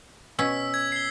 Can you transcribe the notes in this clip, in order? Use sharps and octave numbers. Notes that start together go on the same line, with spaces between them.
B2 C#4 E6 B6
G#6
C7 G7